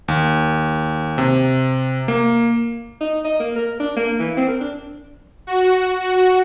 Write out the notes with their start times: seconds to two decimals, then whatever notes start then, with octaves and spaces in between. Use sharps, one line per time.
0.08 D#2
1.18 C3
2.08 A#3
3.01 D#4
3.24 D#5
3.40 A#3
3.56 A#4
3.80 D4
3.96 A#3
4.19 E3
4.37 C4
4.48 A#4
4.60 D4
5.47 F#4
6.00 F#4